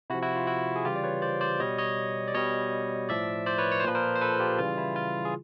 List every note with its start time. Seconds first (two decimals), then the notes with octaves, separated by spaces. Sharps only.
0.10 C3 E4 F#4
0.14 F3
0.23 E4 F#4
0.36 F4
0.47 E4 F#4
0.76 G#4
0.85 C#3 E3 G3 F4 G4
0.96 D5
1.03 B4 C#5
1.22 C5 D5
1.41 C5 D5
1.60 B2 G3 C#5 D#5
1.78 C#5 D#5
2.28 D5
2.34 B2 G3 C#5 D#5
3.09 A2 F3 D5 E5
3.46 C5 D5
3.58 B4 C#5
3.71 C#5
3.80 C5
3.84 A#2 F3 B4
3.95 A#4 C5
4.16 C5
4.21 A4 B4
4.40 F4 G4
4.59 C#3 E3 G3 F4
4.78 E4
4.96 F4
5.25 G#4